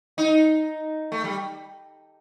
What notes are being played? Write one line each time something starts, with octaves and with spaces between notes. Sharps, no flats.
D#4
A3
G3